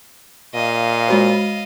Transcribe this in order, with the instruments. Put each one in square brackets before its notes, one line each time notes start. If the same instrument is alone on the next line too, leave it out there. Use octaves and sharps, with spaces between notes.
[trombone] A#2 [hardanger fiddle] D#5 F5
[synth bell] G#3 F#4 C5